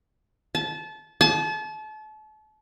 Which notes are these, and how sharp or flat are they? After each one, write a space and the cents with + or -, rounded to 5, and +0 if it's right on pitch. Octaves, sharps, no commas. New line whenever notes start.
A5 -25
A5 -35